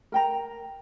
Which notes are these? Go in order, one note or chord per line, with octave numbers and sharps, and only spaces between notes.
A#4 G5 A#5